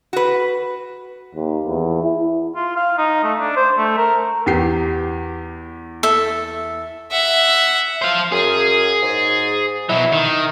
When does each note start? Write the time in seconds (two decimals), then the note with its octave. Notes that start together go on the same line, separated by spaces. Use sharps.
0.13 F#4 B4
1.35 D#2
1.66 E2
2.03 E4
2.56 F4
2.77 F5
2.98 D#4
3.24 A3
3.40 D4
3.56 C5
3.78 A3
3.98 A#4
4.46 E2 G4 C7
6.03 A4 E5
7.12 E5 F#5
8.02 C5 F5
8.32 F#2 G#4
9.02 G#2
9.89 B2 F#3 E4
10.12 D#3